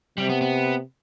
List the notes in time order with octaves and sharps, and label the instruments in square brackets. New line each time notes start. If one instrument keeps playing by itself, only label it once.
[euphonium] C3 [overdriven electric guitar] G3
[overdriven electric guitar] B3
B3